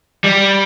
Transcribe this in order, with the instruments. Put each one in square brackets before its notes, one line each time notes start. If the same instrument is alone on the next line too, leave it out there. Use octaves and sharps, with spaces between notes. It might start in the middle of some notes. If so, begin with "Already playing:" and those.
[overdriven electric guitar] G3